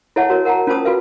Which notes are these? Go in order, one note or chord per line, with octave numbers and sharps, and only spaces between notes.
E4 A4 C#5 E5 F#5 A5
F#4 A#4 C#5
A#4 F#5 G5 A5 A#5
C#4 F4 A#4 C5 A5 D#6
F4 F#4 A4 B4 F5